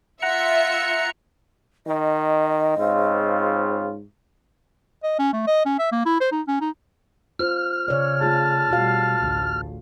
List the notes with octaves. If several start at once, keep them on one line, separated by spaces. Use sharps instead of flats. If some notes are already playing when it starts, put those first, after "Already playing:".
F4 E5 F#5 A#5 C#7
D#3 D#5
G#2 C#3 C4 F4
D#5
C#4
A3
D#5
C#4
E5
A#3
E4
C5
D#4
C#4
D#4
F4 C5 F6
C#3 C#5 D5
A3 F4 G#4 A5
B2 G3 F4 F#4 F5
A1 D2